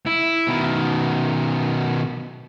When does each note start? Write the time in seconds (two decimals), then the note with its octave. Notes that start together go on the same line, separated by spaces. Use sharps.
0.06 E4
0.47 B2 D#3